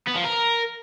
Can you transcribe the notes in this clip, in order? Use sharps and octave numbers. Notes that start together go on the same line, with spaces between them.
B3
F3
A#4